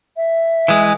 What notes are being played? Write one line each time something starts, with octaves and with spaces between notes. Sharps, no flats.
E5
E3 G#3